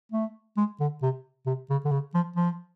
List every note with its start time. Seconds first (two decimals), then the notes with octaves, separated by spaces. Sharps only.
0.12 A3
0.57 G#3
0.80 D3
1.02 C3
1.46 C3
1.70 C#3
1.85 D3
1.92 C#3
2.14 F3
2.36 F3